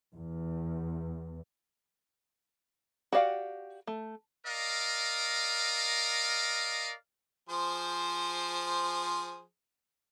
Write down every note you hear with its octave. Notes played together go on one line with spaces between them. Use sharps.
E2
F#4 G4 D5 F5 F#5
A3
A#4 D5 D#5 F5
F3 G#4 C5